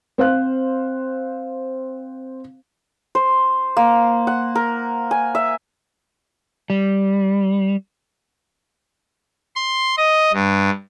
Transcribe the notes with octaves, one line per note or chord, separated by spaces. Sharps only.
C4 C5 F5 F#6
C5
A#3
F#5
A#4
G#5
E5
G3
C6
D#5
G2